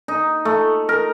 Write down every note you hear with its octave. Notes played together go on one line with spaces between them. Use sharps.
D#4
A3
A#4